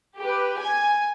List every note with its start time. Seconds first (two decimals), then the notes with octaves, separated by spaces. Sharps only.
0.19 G4 B4
0.59 G#5